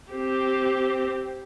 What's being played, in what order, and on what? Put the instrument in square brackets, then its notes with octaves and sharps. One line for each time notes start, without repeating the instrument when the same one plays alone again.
[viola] C4 G4